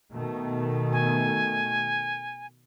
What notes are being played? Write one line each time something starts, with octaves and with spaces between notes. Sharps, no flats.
B2 D#3 A3
G#5